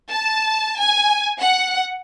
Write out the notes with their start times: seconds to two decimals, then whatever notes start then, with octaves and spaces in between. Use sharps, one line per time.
0.10 A5
0.80 G#5
1.40 F#5